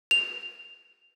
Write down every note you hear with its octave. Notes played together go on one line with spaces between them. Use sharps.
F7